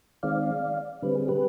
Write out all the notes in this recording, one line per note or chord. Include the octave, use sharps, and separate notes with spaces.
D#3 G#3 C4 D5 F5
D3 G3 C4 B4
G#4
G4 B4